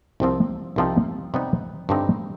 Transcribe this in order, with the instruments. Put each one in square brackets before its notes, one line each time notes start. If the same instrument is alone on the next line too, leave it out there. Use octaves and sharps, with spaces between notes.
[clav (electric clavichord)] C2 C3 F3 C4
C2 C3 F3 C4 D#4
C3 G3 B3 D#4
G2 D3 G3 C4 D#4